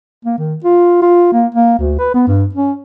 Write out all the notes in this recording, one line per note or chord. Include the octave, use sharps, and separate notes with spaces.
A#3
D#3
F4
F4
A#3
A#3
D2
B4
B3
G2
C#4